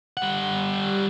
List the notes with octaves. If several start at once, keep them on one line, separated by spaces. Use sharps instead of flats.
G3 F#5